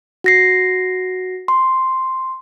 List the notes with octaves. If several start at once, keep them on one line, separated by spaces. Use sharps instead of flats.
F#4 A#6 C7
C6